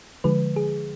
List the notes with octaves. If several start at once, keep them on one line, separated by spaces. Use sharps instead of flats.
D3 F3 G#3 B4
G#4